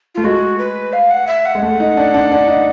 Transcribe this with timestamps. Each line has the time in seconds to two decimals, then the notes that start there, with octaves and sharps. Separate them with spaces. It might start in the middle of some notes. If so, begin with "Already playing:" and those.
0.15 A3 F4
0.24 G#3 F#4
0.58 B4
0.93 F5
1.10 F#5
1.27 E5
1.45 F#5
1.55 G#3
1.63 A3
1.80 D#4
1.97 D4
2.14 D4
2.32 D4
2.48 D#4